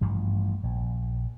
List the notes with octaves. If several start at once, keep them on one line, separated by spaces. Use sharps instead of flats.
A1 G2 F3
A#1